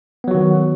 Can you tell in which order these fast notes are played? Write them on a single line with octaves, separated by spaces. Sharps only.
B3 F#3 F#4 D#3